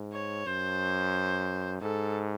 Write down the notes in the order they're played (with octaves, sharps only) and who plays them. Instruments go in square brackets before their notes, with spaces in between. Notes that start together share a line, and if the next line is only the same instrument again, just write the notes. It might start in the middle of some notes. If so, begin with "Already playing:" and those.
Already playing: [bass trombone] G#2
[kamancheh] C#5
[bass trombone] F#2 [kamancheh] C5
[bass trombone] G#2 [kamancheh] A4